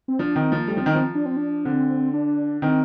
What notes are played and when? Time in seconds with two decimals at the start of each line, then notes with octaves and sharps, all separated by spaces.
0.08 C4
0.19 F3 D4
0.36 D#3 C4
0.52 F3 A#3
0.67 G3 A3
0.77 F3 C4
0.86 D#3
0.93 F3 C4
1.15 D4
1.26 C4
1.37 D4
1.65 D3 C4
2.13 D4
2.62 D#3 C4